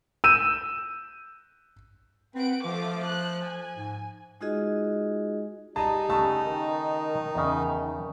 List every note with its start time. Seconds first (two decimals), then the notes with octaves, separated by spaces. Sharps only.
0.24 E6 G6 D#7 E7
2.35 C4 B4 F#5 D7
2.65 F3 A3 F4 D6
3.06 F#6
3.44 G#5
3.76 G#2
4.41 G#3 D#4 F4 F#4 G#4 D#5
5.76 G3 D#4 G#4 D#5 A5 A#5
6.10 C#3 A3 A5
6.46 D#3
7.35 E2 C#3